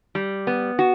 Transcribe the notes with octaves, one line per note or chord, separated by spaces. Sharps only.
G3
B3
F#4